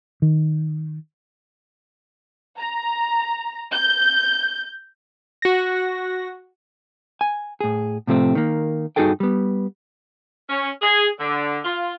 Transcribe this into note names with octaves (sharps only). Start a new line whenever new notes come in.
D#3
A#5
G6
F#4 A#6
G#5
A2 G#4
A2 C3 F3 A3 C4
D#3 A#3
G2 D#4 F#4 G#4 A4 G5
G3 B3
C#4
G#4
D3
F4